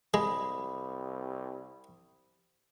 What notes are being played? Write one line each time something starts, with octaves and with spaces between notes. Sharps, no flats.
C2 G#3 B5 D#6